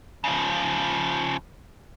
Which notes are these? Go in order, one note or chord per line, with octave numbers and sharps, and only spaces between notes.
C#3 F3